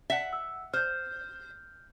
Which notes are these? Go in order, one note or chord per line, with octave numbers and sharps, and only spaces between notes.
E5 F#5
E6
C5 F6 G6